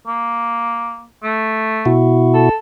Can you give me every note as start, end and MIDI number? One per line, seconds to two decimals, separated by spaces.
0.07 1.04 58
1.24 1.93 57
1.86 2.49 47
1.86 2.49 64
1.86 2.49 66
2.34 2.55 69